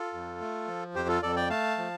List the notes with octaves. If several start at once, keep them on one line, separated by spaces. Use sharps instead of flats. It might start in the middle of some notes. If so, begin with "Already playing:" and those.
Already playing: F4 A4
F2
A3
F3
F2 G4 C5
F4 A4
F2 A4 D5
D5 G5
A3 F5 A5
F3